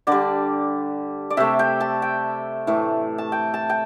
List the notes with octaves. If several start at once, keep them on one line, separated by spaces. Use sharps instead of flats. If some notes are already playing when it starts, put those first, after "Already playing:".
D3 G3 D5
D5
C3 A3 E5
G5
A5
G5
A2 E3 A3
A5
G5
A5
G5